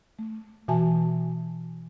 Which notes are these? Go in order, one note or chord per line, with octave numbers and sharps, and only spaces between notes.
A3
B2 E3 F#4 E5 G#5 A5